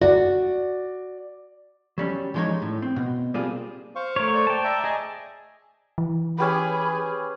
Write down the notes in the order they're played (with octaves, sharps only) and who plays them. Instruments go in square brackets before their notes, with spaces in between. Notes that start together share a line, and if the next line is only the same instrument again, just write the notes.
[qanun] F#4 [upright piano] D5
[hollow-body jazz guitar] F#3 G3 C#4
E3 F3 G#3 D4 D#4 C#5
A2
C4
B2
G3 A#3 C4 D4 F4 G#4
[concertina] C5 F5 C#6
[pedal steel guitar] A3 A#4 C#5
[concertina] C5 D5
[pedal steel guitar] G5 A5
[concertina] D5 E5 A#5
[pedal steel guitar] G#4 [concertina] D#5 G#5 A5
[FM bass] E3
[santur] C#4 G4 B4 [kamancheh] G#4 [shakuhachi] B5